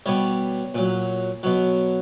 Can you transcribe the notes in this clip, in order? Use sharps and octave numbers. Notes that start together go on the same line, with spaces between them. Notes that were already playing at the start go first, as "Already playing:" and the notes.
B2 G3 C#5
A#2 F#3
B2 F#3